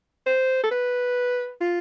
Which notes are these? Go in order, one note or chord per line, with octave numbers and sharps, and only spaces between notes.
C5
A4
B4
F4